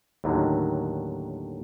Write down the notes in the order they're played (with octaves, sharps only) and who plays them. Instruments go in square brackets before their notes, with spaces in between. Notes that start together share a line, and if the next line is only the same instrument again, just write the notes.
[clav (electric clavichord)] D#2 A2 D3 D#3 F#3